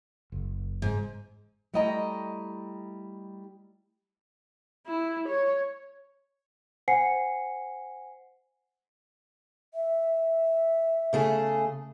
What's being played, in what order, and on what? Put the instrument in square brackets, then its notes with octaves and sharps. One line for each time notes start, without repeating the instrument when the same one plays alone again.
[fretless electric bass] F#1
[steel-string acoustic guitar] G#2
G3 A3 E4 D#5 G5 A#5
[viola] E4
C#5
[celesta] C5 F#5 G#5 C7 C#7
[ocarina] E5
[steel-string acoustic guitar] C#3 A3 G#4